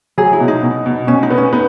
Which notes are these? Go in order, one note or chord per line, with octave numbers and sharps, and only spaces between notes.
F#3 G#4
E4
B2
D#4
B2
B2
B2 C#4
D#4
B3
C#4
B3 D#4